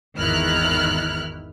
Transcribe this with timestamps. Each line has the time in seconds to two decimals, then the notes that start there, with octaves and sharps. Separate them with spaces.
0.17 G#1 E2 D#3 E4 F6 F#6